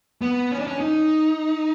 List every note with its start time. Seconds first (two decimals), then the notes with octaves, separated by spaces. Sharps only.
0.21 B3
0.51 C#4
0.60 D4
0.67 C#4
0.80 D#4